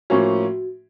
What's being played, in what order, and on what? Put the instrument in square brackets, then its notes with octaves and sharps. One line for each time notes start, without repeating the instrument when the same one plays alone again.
[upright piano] A2 F3 A#3 C#4 [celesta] F#4